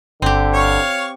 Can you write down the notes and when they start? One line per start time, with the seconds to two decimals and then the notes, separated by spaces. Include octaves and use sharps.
0.22 G1 D3 C4 G4
0.54 C#5 F5 C#6